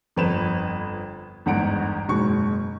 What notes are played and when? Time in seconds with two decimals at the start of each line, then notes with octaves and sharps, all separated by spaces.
0.16 G1 F2 B4 C5 E7
1.46 G1 E2 G#2 F#5 A#5 D7
2.08 F#1 G#2 B2 G#3 C#6